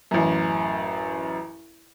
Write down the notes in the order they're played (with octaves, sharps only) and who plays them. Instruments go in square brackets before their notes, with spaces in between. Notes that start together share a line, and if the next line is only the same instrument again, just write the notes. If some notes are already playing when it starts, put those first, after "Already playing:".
[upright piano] A1 F#2